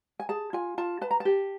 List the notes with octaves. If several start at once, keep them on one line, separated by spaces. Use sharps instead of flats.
G#5
G#4 A5
F4 G#5
F4 A5
B4 A5
A#5
A5
G4